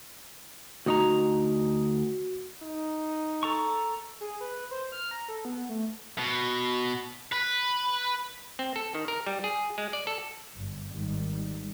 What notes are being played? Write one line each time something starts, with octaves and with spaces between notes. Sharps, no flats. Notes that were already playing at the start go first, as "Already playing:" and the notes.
D2 D#4 F#4 A#5
D#4
A4 A#5 C#6
G#4
B4
C5
F6
A#5
A4
B3
A3
B2
B4
C4
A4
D#3
A#4
G3
G#4
G#3
D5
A4
G1 G2
G#1 D#3 G3